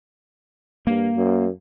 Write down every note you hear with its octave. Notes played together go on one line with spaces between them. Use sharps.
G2 A#3
F#2